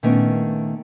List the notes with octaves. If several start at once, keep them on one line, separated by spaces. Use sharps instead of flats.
A#2 D#3 A3 B3 C#4 D4